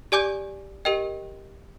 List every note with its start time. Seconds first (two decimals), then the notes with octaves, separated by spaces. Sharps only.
0.12 G4 D5 G#5 D6 G6
0.85 G4 A#4 D#5 G5